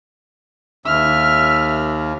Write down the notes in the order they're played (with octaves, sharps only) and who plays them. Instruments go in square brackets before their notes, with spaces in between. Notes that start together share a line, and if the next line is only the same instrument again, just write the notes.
[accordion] D#2 [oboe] E5 [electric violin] F6